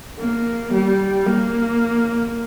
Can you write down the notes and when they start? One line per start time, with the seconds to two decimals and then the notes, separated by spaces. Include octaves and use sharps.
0.19 A#3
0.73 G3
1.26 A#3